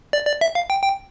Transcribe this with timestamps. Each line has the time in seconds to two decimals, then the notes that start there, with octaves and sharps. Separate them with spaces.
0.13 D5
0.27 D5
0.41 E5
0.55 F5
0.70 G5
0.83 G5